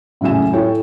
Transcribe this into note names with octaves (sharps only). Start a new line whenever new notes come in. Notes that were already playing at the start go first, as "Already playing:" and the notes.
A2 C#3 F#3 E5 G#5 E7
E4 A4 C#5 G5